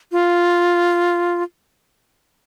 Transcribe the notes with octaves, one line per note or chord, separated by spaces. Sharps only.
F4